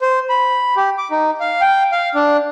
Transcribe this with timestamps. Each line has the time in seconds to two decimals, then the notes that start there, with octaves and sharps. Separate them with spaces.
0.02 C5
0.29 B5
0.77 G4
0.98 D6
1.11 D#4
1.40 F5
1.61 G5
1.92 F5
2.15 D4